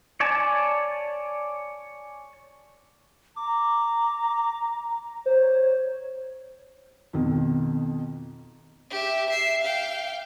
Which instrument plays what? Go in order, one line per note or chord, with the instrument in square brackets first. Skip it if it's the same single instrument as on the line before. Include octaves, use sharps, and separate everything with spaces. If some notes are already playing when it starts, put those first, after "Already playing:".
[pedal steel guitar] C#5 D5 G#5 A5
[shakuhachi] A#5 [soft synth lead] D6
[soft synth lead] C5 [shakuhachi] C#5
[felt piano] F2 B2 D#3
[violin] G4 E5
E5 C7
F5 G5